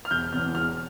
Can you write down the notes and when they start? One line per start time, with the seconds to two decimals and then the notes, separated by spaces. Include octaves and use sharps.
0.05 F6
0.11 E1 G6
0.32 E2 B2 F6
0.55 E1 F6